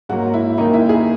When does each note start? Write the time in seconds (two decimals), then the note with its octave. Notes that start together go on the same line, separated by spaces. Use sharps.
0.09 G#2 F#3 A#3 F#4
0.34 E4
0.58 F#2 D#3 A#3 D#4
0.74 E4
0.89 G#4